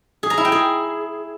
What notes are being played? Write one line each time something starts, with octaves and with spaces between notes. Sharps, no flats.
G#4
A#5
E4
G5
G#4